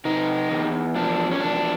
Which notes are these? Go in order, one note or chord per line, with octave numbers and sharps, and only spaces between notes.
C3 D#4
E2
F3 D4
C#4
E2 D4